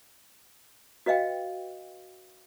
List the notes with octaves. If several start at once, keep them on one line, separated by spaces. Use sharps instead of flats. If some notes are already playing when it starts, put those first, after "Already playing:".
F#4 B4 D#5 F5 G5